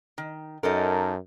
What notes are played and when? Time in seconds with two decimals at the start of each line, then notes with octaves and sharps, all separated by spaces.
0.18 D#3
0.63 F#2 D#4 A4 A#4